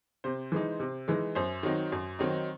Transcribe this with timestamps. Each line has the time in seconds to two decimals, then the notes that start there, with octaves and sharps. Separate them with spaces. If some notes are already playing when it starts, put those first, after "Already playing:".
0.24 C3 C5
0.52 E3 G#3 D#4
0.80 C3
1.08 E3 G#3 D#4
1.35 F#2 C5
1.63 D#3 F#3 C4 D#4
1.92 F#2
2.19 D#3 F#3 C4 D#4